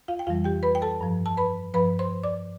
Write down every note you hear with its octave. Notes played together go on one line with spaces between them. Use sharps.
F4 F5
G5
F2 E3 G3 F4 F5
G4 G5
B4 B5
G5
A4 A5
G2 F3
A5
B4 B5
G2 F3 B4 B5
C5 C6
D5 D6